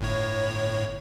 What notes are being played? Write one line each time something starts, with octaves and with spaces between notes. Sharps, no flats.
G1 A2 C#5